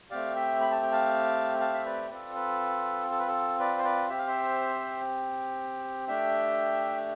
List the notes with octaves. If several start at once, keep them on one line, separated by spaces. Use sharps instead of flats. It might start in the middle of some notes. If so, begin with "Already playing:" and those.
A3 C4 G4 D5 F5
E5 G5
B5
A5
G5
F5 A5
F5 A5
E5
B4 D5
C4 F4 A4 B4 D5
B4
A4
B4
A4
B4 D5
C5
B4 D5
C4 G4 E5
F5
C5 E5
A3 D4 G4 E5 G5